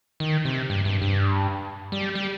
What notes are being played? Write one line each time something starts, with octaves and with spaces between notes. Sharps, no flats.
D#3
C3
G2
G2
G2
G3
G3